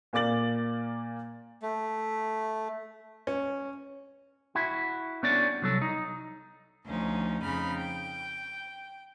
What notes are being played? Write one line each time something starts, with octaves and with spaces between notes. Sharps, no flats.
A#2 A#3 D5 D6 A6 F#7
A3
C#4
E4 F#4
B3 C#4 D4 G4 D5
C2 F#3 A4
D#4
D2 F3 C#4 D#4
F2 C#3 D#4 B5 F6
G5